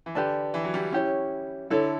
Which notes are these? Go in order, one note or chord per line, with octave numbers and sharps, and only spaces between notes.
E3
D3 G4 B4 D5 A5
E3
F#3
G3
C#4 E4 G4 C#5
D3 E4 A4 C#5